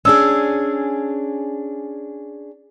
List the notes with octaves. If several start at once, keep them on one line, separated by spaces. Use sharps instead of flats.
C#4 D4 G#4 E6